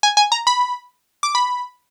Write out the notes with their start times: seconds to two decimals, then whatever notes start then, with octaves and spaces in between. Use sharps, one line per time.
0.03 G#5
0.17 G#5
0.32 A#5
0.47 B5
1.23 D6
1.35 B5